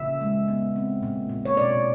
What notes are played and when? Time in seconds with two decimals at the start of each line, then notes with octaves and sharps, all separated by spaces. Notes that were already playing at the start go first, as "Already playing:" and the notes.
Already playing: A#2 C#3 E5
0.21 G#3
0.48 B3
0.76 C4
1.03 A#2
1.29 A#2
1.45 C#5
1.57 B2 D5